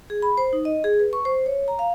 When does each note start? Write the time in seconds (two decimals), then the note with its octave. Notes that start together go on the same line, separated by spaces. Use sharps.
0.10 G#4
0.22 B5
0.37 C5
0.53 D#4
0.65 D#5
0.84 G#4
0.99 B4
1.13 C#6
1.25 C5
1.46 C#5
1.68 A#5
1.79 F5